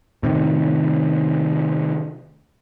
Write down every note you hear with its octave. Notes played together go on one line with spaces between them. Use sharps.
A2 C3 D#3